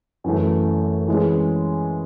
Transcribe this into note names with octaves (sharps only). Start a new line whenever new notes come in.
F#2 E3 A3
E3 G#3 C#4